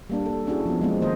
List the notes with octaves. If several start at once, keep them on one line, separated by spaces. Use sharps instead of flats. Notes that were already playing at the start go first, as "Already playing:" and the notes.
G3 A#3 D4
A4
C#4 D4 E4 F#4 G#4
F3 B3
G#3 A#3 C4
D#3 A#3 C5 D#5